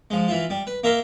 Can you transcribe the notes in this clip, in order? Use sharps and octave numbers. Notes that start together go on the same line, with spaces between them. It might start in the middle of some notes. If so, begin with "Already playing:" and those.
F3 G#3
E3 E4 F4
G3
B4
A#3 A#4 E5 A#5 C6